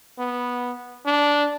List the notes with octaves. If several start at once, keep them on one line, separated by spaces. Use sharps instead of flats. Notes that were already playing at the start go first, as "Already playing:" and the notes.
B3
D4